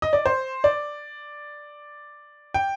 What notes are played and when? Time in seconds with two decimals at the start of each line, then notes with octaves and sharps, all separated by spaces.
0.02 D#5
0.13 D5
0.26 C5
0.64 D5
2.54 G5